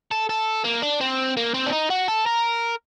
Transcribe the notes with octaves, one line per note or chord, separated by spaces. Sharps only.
A4
A4
A#3
D4
C4
A#3
C4
D4
D#4
F#4
A4
A#4